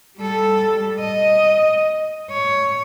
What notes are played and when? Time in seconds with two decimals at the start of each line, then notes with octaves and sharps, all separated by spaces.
0.18 G3 A4
1.00 D#5
2.30 C#5